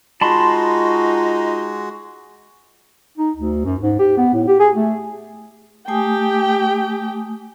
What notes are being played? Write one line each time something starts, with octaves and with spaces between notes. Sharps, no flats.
G#3 D#4 F4 F#4 A5 B5 C6
D#4
D2
F#2
G#2
G4
B3
A2
G4
G#4
A3
A3 G4 G5 G#5 D#6